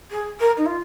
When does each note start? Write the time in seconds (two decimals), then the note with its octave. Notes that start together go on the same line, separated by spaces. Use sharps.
0.10 G#4
0.39 A#4
0.57 D#4
0.65 F4